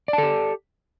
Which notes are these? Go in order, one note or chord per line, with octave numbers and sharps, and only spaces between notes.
G4 A4 D5 A5